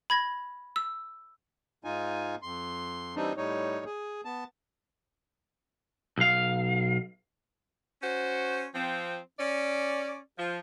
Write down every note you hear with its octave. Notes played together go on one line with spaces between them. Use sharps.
B5 G#6 A#6
E6
G#2 D#4 F4 G#5
F2 C6
E3 G3 C4 D4 D#4
A2 G3 D#4 C#5
G#4
B3 A5
B1 F5
C#4 F#4 C5
F3 C4
C#4 D5
F3